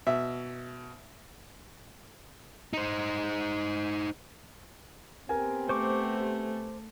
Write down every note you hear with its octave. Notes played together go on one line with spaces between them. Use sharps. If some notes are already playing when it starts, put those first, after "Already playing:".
B2 E5
D#4 C5
B3 C4 G4 A#4 G#5
A3 C5 C#6 D6